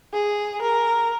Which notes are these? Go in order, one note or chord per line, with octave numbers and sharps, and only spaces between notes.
G#4
A#4